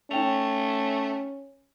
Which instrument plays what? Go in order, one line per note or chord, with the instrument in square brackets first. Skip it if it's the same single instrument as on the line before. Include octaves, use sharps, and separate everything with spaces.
[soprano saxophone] A3 [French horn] C#4 [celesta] D#4 G5 F7